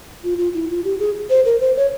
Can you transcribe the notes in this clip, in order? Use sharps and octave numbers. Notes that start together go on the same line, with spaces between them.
F4
F4
E4
F4
G4
G#4
C5
A#4
C5
C#5